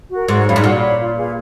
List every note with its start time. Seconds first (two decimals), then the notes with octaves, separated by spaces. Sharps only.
0.10 F#4 A#4
0.28 G#2 F#4
0.45 F#2 C#5 F5 B5
0.56 G#2
0.63 A#2 F#4
0.80 C#5 F5 B5
0.98 F4
1.17 G#4 B4 F5